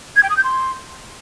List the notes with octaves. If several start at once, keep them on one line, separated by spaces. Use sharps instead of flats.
G#6
G5
D#6
G6
C6